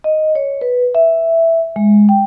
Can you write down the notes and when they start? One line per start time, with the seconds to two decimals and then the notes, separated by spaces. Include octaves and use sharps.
0.04 D#5
0.35 C#5
0.61 B4
0.95 E5
1.76 G#3
2.09 G5